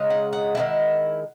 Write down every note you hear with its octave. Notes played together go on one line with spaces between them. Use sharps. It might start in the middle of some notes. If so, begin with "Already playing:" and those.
Already playing: C#3 G#3 D#4
F#5
F#5
D#3 G#3 C4 E4